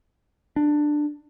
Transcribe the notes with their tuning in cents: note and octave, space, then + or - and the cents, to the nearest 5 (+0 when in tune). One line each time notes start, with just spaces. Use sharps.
D4 +15